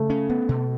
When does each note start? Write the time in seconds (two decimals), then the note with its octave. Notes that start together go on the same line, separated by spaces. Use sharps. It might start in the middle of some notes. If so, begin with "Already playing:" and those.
Already playing: C#3 A3
0.10 C#4
0.30 B3
0.49 B2